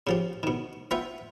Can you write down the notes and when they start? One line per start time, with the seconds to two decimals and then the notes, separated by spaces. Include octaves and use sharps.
0.07 C#3 F3 G4
0.43 B2 D#3
0.91 B3 F4 E5 G5